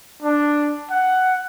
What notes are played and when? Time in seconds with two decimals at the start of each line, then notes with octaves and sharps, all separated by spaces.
0.22 D4
0.91 F#5